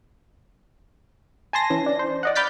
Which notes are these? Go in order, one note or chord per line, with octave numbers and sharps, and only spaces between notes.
G#5 A5 C6 A#6
E3 C#4
D4
C5
D5 D#5 F#5
B5 D6 F6 G6 A6 B6